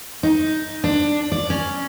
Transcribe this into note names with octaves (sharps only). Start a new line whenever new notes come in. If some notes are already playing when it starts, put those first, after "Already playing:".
D#4
D4
D5
C#4